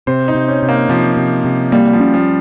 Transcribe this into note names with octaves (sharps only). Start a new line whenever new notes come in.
C3 C5
D#4
C3
C#4
C3
A#3
C3 F3
C3
C3
G3 A#3
F3
C#4
F3